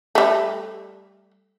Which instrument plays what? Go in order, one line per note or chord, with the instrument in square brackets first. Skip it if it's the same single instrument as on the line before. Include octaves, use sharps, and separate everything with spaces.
[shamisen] G3 A3